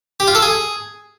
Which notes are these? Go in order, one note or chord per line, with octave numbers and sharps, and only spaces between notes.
G4
F4
A4
G#4